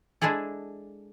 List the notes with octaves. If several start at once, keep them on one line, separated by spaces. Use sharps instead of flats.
G#3 D4 E4 G#4 A4